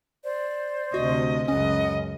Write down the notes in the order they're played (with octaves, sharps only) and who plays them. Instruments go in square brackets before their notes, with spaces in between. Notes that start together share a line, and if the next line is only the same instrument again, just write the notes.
[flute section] C5 D5
[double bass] D2 C3 [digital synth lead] F#4 [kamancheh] D#5
[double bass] C#2 F#2 [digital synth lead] C#4 [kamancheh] D#5 [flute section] F#5